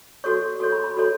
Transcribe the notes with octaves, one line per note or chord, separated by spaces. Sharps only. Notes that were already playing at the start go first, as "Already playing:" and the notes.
F#4 A4 C#5 C#6
F#4 A4 C#5 C#6
B5
B5
F#4 A4 C#5